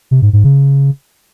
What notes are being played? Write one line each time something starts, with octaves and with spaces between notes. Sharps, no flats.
C3
G#2
G#2
C#3